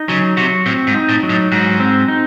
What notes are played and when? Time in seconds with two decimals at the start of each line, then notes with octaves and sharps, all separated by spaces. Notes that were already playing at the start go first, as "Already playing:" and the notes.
Already playing: D#4
0.09 C#3 F#3
0.37 C3 F#4
0.66 A2 C4
0.87 G#2
0.94 D#4
1.09 A2
1.23 F#3
1.29 A2
1.52 G#2 F#4
1.80 C4
2.08 D#4